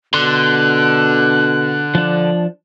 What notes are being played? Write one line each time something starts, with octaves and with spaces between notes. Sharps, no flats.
B2 D3 C6 F#6
F3 D4